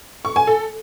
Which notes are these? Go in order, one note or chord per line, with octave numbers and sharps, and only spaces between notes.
C#6
G#5
A4